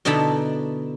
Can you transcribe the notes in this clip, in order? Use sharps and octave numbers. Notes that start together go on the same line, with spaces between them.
B2 D3 D#4 E4 A5 B5